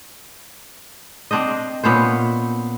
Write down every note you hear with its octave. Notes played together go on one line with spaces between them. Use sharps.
C4 D4 C5 D#5
A#2 B3 C#4 C5